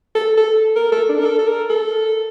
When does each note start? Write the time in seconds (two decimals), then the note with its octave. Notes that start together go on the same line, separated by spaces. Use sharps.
0.15 A4
0.38 A4
0.76 A#4
0.92 A4
1.09 D4
1.19 A#4
1.25 A4
1.39 A4
1.48 A#4
1.70 A4